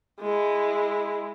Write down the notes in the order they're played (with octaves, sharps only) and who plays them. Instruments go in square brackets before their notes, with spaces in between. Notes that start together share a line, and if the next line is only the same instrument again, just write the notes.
[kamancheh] G#3 E4